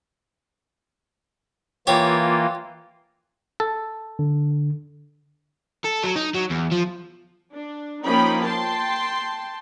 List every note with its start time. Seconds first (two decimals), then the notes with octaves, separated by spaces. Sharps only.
1.87 E3 A#3 F4 G4 C#5
3.60 A4
4.19 D3
5.84 A4
6.03 F#3
6.16 D#4
6.35 F#3
6.50 E2
6.72 F3
7.54 D4
8.05 F3 A#3 C#4 D#4 G5 B5
8.42 G5 A5 C6